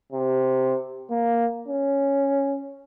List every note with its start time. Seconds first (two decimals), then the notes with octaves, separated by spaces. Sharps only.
0.13 C3
1.11 A#3
1.68 C#4